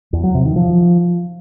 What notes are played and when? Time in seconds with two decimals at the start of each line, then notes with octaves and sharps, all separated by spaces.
0.13 E2
0.24 F#3
0.34 C3
0.45 D#3
0.56 F3